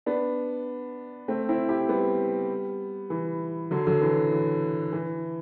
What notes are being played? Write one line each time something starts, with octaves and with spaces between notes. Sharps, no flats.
B3 D4
A3 C4
C4 E4
E4 G4
G3 B3
E3
D3 F#3
D3 F#3
E3
E3
E3